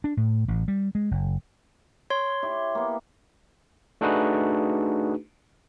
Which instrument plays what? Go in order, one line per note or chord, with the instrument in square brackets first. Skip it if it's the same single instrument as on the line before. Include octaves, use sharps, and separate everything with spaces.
[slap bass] D4
A2
A1
G3
G#3
F#1
[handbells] C#5 C6
[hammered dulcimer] E4 G4
A#3 B3
[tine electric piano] A3 D4 D#4 F#4 G#4 B4